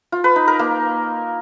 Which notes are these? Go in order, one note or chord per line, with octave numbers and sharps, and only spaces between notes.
F4
B4
D#4
A#4
A#3